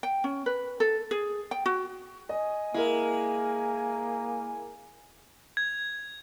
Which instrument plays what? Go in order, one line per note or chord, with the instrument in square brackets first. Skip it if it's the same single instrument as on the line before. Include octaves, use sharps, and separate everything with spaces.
[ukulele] G5
C#4
B4
A4
G#4
G5
F#4
[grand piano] D#5 [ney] G#5
[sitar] G#3 [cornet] A#3 [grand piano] E4 A#4
[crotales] G#6